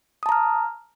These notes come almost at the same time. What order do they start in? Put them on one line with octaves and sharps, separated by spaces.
D#6 A5 A#5 F6